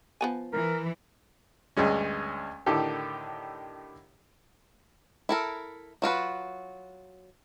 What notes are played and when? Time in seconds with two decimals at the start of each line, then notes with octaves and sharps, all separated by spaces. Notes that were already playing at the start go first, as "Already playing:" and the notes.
0.21 F3 B3 G#5
0.53 E3 A#4
1.77 D2 G2 G#3 C#4
2.66 A2 D3 D#3 G4 A4
5.29 E4 A4 A#4
6.02 F#3 F4 F#4 B4